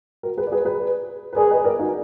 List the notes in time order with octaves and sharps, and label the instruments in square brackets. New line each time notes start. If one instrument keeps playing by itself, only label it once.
[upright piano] F#4 A#4
G#4 B4
D5
G#4 B4
G#4 B4
B4
[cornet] G#4 [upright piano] A#4 D5
[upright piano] B4 D#5
A#4 D5
D#4 F#4